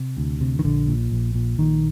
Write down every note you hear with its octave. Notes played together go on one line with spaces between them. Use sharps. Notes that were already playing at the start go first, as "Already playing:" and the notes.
Already playing: C3
D2
C3
D#3
A#1 D3
A#2
A#1
A#2
A#1 D#3